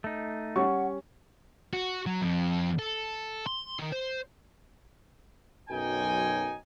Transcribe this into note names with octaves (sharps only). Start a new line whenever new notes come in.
A3 D#4
G3 C#4 F#5 C#6
F#4
F#3
F2
A4
C6
D#3
C5
B1 F#2 D#4 G5 G#5